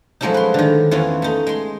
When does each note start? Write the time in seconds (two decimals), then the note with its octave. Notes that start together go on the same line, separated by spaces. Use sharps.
0.21 F3 F#3 G#3 A3 C#4 D#4
0.34 B4 C6
0.54 D3 D#3
0.91 E2 E3 C#4 F4
1.22 A3 D#4
1.47 G#3 C6